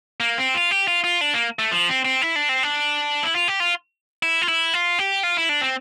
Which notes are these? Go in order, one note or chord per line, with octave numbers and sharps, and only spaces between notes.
A#3
C4
F4
G4
F4
F4
D4
A#3
A3
F3
C4
C4
E4
D4
C4
D4
E4
F4
G4
F4
E4
F4
E4
F4
G4
F4
E4
D4
C4